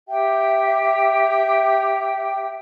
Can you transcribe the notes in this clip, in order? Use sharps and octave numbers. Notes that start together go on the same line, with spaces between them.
G4 E5 G5